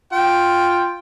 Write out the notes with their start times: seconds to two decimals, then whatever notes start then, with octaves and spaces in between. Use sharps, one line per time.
0.12 F4 G5